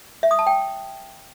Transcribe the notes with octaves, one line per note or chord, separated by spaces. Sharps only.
E5
D#6
A5
G5